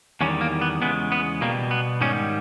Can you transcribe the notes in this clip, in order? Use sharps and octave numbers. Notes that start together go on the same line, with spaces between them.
E2 D#3 G3 C#4
A#3
B3
E2 C#3 G#3 B3
B3
B2 G3 A#3
B3
G#2 D#3 G3 C#4